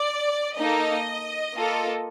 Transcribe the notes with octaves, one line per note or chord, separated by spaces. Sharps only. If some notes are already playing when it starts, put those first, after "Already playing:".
Already playing: D5
A#3 D#4 A4 D#5
A#3 F4 A4